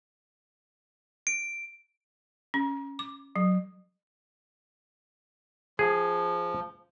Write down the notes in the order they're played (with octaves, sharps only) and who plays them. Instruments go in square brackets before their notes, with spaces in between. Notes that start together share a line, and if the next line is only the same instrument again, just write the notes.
[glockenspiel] D7
[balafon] C#4
D6
F#3
[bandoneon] F3 [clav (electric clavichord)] G#4